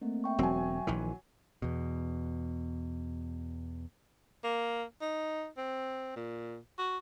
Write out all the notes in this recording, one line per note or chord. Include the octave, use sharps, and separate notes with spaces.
A3 A#3 C4
E5 G5 C#6
E1 F#3 C4 G#5
A#1 D#3 E3
E2 B2
A#3
D#4
C4
A#2
F#4